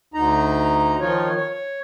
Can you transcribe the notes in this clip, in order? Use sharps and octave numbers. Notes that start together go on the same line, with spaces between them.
D2 D#4 A#5
D#3 F3 D#4 F4 C#5
C#5